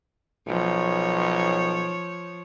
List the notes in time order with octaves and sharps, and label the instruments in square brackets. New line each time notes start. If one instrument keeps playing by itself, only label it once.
[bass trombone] B1 [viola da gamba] F3 C#5